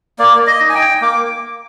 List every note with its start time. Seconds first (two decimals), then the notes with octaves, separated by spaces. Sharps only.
0.19 A#3 D5
0.47 D#5
0.61 D#4
0.70 G#5
0.75 G5
1.01 A#3 D6